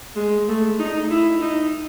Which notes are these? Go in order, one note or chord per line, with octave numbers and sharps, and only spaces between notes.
G#3
A3
D#4
E4
D#4